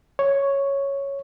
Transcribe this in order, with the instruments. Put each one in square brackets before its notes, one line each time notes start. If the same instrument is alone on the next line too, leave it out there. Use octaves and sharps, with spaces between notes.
[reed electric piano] C#5